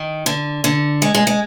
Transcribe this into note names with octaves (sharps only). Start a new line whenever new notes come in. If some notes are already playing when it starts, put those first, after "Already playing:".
Already playing: D#3
D3
D3
G#3
G#3
G#3